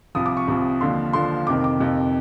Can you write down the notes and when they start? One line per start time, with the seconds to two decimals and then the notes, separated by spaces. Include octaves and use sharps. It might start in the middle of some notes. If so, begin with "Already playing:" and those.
0.15 C2 C3 F3 D#6
0.26 D6
0.37 C#6
0.48 C2 C3 F3
0.81 D#2 D3 F3 C6
1.13 D#2 D3 F3 C6
1.47 F2 C3 D#3 D6
1.64 D6
1.80 F2 C3 D#3